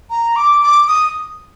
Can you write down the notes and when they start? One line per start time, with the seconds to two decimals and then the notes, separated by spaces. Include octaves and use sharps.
0.10 A#5
0.36 D6
0.63 D6
0.88 D#6